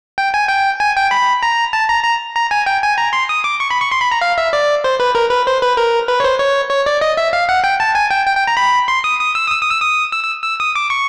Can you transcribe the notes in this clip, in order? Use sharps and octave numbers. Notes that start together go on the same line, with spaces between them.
G5
G#5
G5
G#5
G5
B5
A#5
A5
A#5
A#5
A#5
G#5
G5
G#5
A#5
C6
D#6
D6
C#6
B5
C#6
C6
B5
A#5
F5
E5
D5
C5
B4
A#4
B4
C5
B4
A#4
B4
C#5
C5
C#5
C#5
D5
D#5
E5
F5
F#5
G5
A5
G#5
G5
G5
G5
A#5
B5
C6
D#6
D#6
E6
D#6
E6
D#6
E6
D#6
E6
E6
E6
D#6
D6
C#6